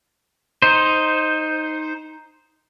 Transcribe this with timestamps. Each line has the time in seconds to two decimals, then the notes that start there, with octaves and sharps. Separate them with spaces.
0.62 D#4 C5